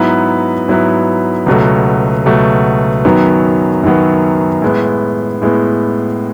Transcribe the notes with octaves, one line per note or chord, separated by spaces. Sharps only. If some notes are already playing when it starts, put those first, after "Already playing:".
Already playing: G#2 F#3 B3 E4 B4
G#2 F#3 B3 E4 B4
C#2 B2 F#3 A3
C#2 B2 F#3 A3
F#2 D#3 F#3 B3
F#2 D#3 F#3 B3
A2 G#3 B3
A2 G#3 B3